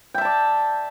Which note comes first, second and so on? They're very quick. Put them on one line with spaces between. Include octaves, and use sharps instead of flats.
G5 E5 A5 D5